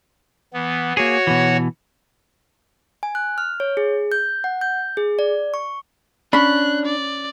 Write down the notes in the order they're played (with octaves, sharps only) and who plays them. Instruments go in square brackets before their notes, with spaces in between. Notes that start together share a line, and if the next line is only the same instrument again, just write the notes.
[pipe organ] E3 B3
[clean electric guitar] A#3 G#4 [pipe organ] F#4 C#5 F#5
[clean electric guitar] B2 E3
[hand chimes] G#5
F#6
F6
C#5
G#4
G6
F#5
G6
G#4
D5
C#6
[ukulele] C#4 B5 [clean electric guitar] D4 [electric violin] F#6
[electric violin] D5